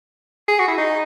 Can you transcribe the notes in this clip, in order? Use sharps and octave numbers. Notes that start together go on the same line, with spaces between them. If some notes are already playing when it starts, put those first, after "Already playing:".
G#4
F#4
E4
D#4